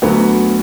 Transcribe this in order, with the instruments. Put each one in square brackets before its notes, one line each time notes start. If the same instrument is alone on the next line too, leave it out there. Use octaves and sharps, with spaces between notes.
[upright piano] D2 D3 F#3 B3